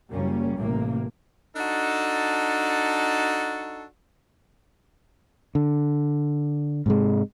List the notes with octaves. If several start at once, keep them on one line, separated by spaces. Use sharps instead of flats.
F#1 G3 A#3 C#4
A1 A2 C3 A#3
D4 D#4 F#4 A4
D3
G#2 C3 G#3